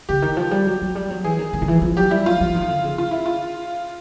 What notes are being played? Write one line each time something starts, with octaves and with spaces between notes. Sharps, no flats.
C#3 G4
D#3
F3
G3
F#3
F#3
G3
F#3
E3 G#4
D#3
E3
D#3
E3
F3
F#3 G4
G3 E4
F#3 F4
F3
D#3
D3
C#3
F4
E4
F4